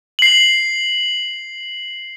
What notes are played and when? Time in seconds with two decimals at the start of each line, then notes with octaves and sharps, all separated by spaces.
0.19 C7 F#7